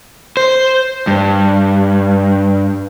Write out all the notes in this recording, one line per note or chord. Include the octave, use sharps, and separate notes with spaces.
C5
G2